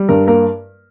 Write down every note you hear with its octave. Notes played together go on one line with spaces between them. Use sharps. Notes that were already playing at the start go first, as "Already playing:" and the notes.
Already playing: G3
G2 A#4
A#3 A#4